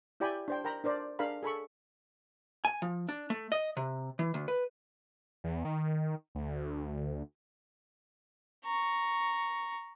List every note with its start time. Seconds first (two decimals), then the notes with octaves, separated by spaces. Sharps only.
0.20 E4 G4 D5 G5 G#5 B5
0.48 D4 C5 G5
0.64 A#4 G5 A#5 B5
0.84 D4 A#4 C5 D5
1.19 D4 G#4 A#4 F5 B5
1.43 G#4 A4 B5 C#6
2.65 G#5
2.82 F3
3.09 D4
3.30 A3
3.52 D#5
3.77 C3
4.19 E3
4.34 D2
4.48 B4
5.44 E2
5.65 D#3
6.35 D2
8.65 A#5 C#6